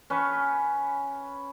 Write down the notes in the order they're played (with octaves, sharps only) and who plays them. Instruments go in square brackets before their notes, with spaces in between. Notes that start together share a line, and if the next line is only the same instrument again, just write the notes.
[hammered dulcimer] C#4 B4 A5 C#6